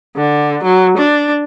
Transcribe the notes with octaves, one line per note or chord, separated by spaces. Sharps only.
D3
F#3
D4